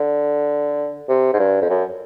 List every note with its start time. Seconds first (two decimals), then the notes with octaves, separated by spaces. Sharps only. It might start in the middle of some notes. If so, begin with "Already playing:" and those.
Already playing: D3
1.09 C3
1.34 G#2
1.39 G2
1.62 F2
1.70 F#2